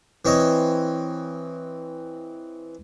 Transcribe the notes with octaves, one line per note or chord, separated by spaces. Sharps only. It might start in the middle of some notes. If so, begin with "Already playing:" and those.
E3 C4 C#5 D#5